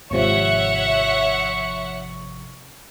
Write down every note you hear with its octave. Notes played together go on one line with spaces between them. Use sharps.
G#1 C3 F3 C#5 E5 F#5 C#6